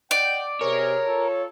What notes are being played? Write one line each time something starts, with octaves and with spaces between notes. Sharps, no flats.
D5 D#5 F#5 G5
C3 G#4 A#4 C#5
F4 A4